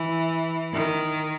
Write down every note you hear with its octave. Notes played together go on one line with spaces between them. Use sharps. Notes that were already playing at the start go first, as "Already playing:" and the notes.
Already playing: E3
D#3